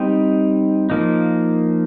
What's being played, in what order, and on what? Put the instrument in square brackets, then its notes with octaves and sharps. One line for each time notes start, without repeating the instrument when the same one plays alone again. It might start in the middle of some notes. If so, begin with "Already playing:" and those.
Already playing: [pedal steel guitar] G3 C4 D#4 G5
F3 A#3 D#4